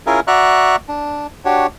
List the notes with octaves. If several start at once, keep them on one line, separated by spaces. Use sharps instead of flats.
C#4 E4 F4 G#4 A#4
F#4 D5 E5 A#5 C#6 F#6
D4
D4 F#4 G4 C#5